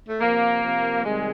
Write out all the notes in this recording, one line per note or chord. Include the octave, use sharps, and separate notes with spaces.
A3
C3 F3 A#3
C3 F3
C3 D#3 G3 G#3